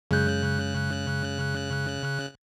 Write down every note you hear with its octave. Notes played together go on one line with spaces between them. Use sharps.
F#2 C#3 G#3 F#6 G6